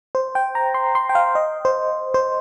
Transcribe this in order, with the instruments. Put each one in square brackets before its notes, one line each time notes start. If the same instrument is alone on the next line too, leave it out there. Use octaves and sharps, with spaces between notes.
[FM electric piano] C5
G5
A#5
C6
C6
G5
F5
D#5
C5
C5